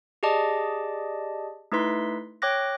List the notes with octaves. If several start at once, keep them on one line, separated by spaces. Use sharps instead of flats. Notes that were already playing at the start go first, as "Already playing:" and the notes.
G4 G#4 D5 D#5 A5 D6
A3 D#4 E4 B4 C6 B6
C#5 G5 D6 F#6 A#6